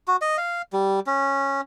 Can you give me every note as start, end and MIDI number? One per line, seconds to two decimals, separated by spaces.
0.08 0.16 66
0.22 0.37 75
0.38 0.62 77
0.73 1.00 55
1.07 1.61 61